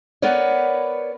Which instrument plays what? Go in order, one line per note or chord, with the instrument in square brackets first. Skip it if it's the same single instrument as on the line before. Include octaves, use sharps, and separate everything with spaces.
[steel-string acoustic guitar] B3 A#4 B4 C#5 D5